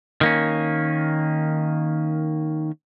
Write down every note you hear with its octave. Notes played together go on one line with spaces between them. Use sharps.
D#3 A#3 C#4